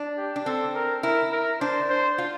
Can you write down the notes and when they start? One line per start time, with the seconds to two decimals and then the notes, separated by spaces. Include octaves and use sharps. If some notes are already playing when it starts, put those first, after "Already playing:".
Already playing: D4
0.18 G4
0.36 D4
0.46 C4 A4
0.75 A#4
1.03 E4 A#4
1.32 A#4
1.61 D4 C5
1.90 C5
2.18 F4